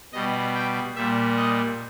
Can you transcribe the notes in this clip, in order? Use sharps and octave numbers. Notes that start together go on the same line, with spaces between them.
B2 G3 D#5
G5
A#2 G3 E5
D#5